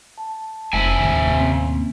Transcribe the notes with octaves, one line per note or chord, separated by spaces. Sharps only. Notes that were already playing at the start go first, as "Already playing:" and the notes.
A5
F1 C3 E5 G#5
D#2 A2
A#3 C4 C#4